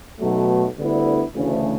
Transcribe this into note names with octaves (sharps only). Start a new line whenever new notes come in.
B1 B2 F#3 A3
D2 D3 G3 B3 E4
D2 C#3 E3 A3